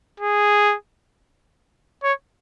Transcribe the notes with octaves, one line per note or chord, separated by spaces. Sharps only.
G#4
C#5